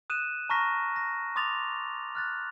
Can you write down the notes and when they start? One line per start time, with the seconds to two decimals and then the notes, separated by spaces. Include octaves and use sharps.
0.10 D#6 F#6 D#7 E7
0.50 A5 A#5 C#6 F6 A#6 B6
0.96 A#6
1.36 C6 D6 D#6 A6 F7
2.15 F6 F#6 A6